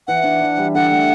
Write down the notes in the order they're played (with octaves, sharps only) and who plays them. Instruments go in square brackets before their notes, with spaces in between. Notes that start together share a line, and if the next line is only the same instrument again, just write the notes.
[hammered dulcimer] E3 [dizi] F#5
[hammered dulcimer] D4
E3
G3
[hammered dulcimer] D3 [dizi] F#5
[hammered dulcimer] A3